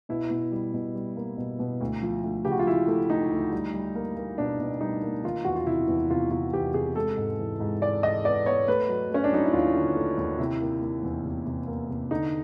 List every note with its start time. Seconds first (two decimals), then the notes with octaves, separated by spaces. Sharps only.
0.09 B2 E4
0.30 B2
0.52 G3
0.73 B2
0.94 G3
1.16 A#3
1.37 B2
1.59 B2
1.81 D2
2.03 F3
2.24 D2
2.45 C#3 G4
2.52 F#4
2.59 F4
2.67 F3 E4
2.88 A3
3.10 A3 D#4
3.32 D2
3.52 G3
3.73 G3
3.95 A#3
4.17 A#3
4.38 B2 D4
4.60 B2
4.81 G3 D#4
5.03 A#3
5.24 D#3 F4
5.45 E2 F#4
5.56 F4
5.66 C3 E4
5.88 E2
6.10 C3 F4
6.31 C3 F4
6.53 E2 G4
6.74 C3 G#4
6.96 G#3 A4
7.17 G#2
7.39 E3
7.60 G#2
7.82 G#3 D5
8.02 E3 D#5
8.24 B3 D5
8.46 B3 C#5
8.68 A3 B4
8.88 F#3
9.11 A3 C#4
9.24 D4
9.32 F#3 D#4
9.44 E4
9.53 D#2 F4
9.74 D3
9.96 A3
10.18 D#2
10.39 C3 E4
10.61 A#3
10.82 A#3
11.03 E2
11.24 C3
11.46 C3
11.67 A#3
11.89 C3
12.11 D3 D#4